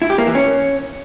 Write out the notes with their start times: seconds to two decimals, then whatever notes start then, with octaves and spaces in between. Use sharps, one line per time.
0.02 E4
0.10 G4
0.18 A#3
0.27 E3
0.35 C#4